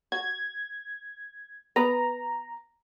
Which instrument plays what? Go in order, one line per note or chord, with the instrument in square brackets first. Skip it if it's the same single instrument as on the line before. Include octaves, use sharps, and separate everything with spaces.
[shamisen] F#4 [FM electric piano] G#6
[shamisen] B3 B4 [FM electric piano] A#5